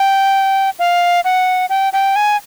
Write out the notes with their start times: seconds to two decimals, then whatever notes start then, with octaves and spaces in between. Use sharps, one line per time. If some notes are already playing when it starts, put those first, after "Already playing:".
Already playing: G5
0.79 F5
1.25 F#5
1.70 G5
1.93 G5
2.16 G#5